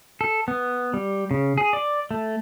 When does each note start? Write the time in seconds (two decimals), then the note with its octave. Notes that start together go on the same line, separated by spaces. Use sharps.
0.21 A4
0.48 B3
0.94 G3
1.31 C#3
1.58 G#4
1.73 D5
2.11 A3